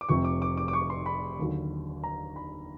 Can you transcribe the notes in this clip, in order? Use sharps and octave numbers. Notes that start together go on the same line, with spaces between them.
D6
F1 F2 C3 C#6
D6
D6
D6
D6
C#6
C6
B5
D#2 D3 F#3
A#5
B5